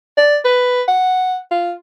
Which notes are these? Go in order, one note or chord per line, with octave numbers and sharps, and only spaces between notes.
D5
B4
F#5
F4